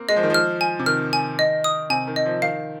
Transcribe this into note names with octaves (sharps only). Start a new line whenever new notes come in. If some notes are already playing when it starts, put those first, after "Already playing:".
Already playing: A#3 C4
G#3 D#5
F3
D#3
F3 F6
G#5
C3
D#3 F6
G#5
D#5
D#6
C3 G#5
D#3
D#5
F3
D#3 F5